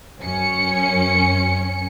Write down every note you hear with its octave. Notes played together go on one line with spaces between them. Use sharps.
F#2 C#4 C#7